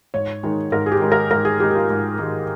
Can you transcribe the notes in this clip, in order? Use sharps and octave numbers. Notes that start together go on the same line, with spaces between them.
G#2 C#5
D#3 G#3 D#4
G#2 A#4
G#4
G4
D#3 G#3 D#4
A#4
G#2 A#4
G#4
D#3 G#3 D#4 G4
G4
F4
G#2
D#3 G#3 D#4